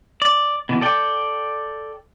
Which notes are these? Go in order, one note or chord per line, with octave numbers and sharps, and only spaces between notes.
D5
B2 E3
A4 D5 G5